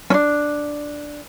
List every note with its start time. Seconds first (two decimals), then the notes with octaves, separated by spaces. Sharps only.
0.10 C#4 D4